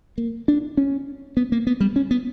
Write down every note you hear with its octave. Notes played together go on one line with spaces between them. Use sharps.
A#3
D4
C#4
B3
A#3
B3
G3
C#4
B3